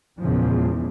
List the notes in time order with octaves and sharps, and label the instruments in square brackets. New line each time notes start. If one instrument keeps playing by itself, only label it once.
[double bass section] E2 A#2 C#3 F3 G#3